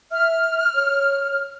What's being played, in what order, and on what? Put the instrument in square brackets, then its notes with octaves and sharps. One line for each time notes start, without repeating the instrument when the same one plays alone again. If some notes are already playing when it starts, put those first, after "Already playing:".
[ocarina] E5 [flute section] F6
[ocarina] C#5